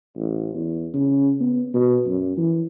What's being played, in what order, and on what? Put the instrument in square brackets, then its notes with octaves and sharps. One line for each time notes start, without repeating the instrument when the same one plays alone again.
[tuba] A1
E2
C#3
B3
B2
F#2
E3